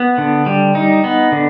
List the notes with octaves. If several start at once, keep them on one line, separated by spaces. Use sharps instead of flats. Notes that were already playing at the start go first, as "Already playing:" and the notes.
Already playing: B3
D3
G3
D#4
B3
D3